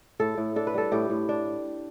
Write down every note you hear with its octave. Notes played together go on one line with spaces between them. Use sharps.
A2 A4
A2
D4 A4
B4
G3 A4
A2 G4
A2
D4